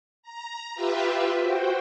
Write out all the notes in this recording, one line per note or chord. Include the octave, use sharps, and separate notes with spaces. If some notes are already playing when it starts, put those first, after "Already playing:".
A#5
F4 G4 B4 E5
F#4 C5 G5